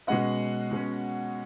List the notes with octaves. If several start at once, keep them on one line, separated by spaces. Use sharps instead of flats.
B2 G#3 C#4 D#5 F#5
B2 G#3 C#4